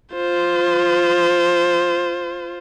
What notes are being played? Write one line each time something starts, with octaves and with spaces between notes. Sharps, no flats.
F4 C5